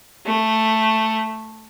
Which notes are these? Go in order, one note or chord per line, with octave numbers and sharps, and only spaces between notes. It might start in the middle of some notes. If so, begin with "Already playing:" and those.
A3